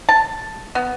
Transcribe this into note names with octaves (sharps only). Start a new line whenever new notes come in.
A5
B3